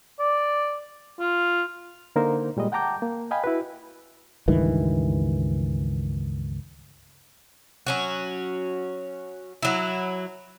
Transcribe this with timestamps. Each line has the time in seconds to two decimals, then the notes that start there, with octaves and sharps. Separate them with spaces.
0.20 D5
1.20 F4
2.16 D3 A#3 D#4 A#4 C5
2.57 A#2 G3 G#3 D#5
2.72 F#5 G5 A5 A#5 D6 G6
3.02 A#3
3.31 D#5 F5 G5 G#5 B5
3.44 E4 F#4 B4
4.48 C#2 G2 D#3 E3
7.87 F#3 C#4 F#4
9.62 F#3 E4